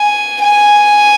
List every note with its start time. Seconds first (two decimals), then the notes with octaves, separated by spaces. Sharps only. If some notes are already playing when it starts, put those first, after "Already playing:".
Already playing: G#5
0.41 G#5